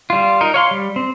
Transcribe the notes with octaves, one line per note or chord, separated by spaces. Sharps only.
G3 F4
D#4 A#4
C#5 F5 C6
G3
C4